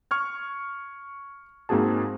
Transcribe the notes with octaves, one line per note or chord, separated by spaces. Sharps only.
C#6 F6 G#6
G#2 A#3 C4 F#4 G#4 A5